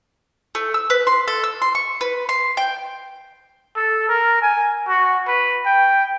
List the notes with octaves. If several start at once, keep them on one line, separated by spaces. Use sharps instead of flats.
A3
E6
B4
C6
A4
E6
C6
C#6
B4
C6
G5
A4
A#4
G#5
F#4
B4
G5